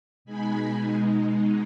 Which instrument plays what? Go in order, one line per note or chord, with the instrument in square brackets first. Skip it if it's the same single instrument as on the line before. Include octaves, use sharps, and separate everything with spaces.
[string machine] B2 G#3 D#4 G#5 B5